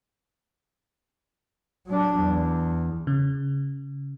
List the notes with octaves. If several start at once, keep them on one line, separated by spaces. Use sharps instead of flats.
F#3 D4
E2
C#3